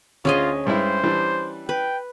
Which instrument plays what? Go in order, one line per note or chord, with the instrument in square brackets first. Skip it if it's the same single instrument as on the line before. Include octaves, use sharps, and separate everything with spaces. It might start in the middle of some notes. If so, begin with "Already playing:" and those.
[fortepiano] D2 [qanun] C#4 G#4 D#5 [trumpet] F4
[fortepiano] G2 G#3 E4 [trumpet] C5
[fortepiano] E3 G3 D4
[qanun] B4 [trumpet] G5